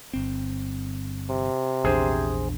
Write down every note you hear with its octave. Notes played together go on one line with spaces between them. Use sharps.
G1 C4
C3
A#1 E2 D4 G#4 C5